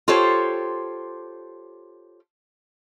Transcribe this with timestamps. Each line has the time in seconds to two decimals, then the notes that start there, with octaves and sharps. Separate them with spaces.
0.08 F4 G4 A4 C5 C#5